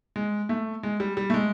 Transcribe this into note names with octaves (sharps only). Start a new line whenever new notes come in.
G#3
A3
G#3
G3
G3
A3
G#3